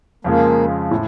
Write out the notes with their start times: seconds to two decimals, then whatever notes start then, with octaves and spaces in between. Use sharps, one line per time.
0.24 F2 C#3 F3 G#3 A#3
0.91 A2